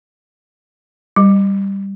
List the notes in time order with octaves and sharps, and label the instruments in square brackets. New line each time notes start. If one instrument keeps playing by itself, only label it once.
[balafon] G3